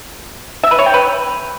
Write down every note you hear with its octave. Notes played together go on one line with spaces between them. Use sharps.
E5
B4
C#5
G5
B4